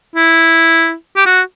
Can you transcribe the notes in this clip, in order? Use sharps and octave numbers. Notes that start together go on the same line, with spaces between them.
E4
G4
F#4